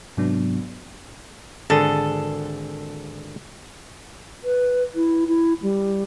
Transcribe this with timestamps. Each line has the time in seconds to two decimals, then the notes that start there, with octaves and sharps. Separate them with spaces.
0.17 G#2 C3 F#3 B3 D4
1.70 G#1 D3 G#4 A4
4.44 B4
4.95 E4
5.27 E4
5.62 G3